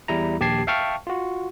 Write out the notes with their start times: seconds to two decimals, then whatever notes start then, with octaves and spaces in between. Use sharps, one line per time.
0.08 E2 G3 E4 A#5
0.40 A#1 D#2 G4 A5 G#6 C7
0.67 E5 F5 G5 A5 C#6 F6
1.07 F4 F#4